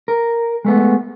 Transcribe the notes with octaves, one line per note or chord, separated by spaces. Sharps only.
A#4
G#3 A3 B3